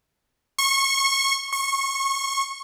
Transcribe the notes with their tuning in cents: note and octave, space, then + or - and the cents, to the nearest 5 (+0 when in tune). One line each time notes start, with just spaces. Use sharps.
C#6 -25
C#6 -25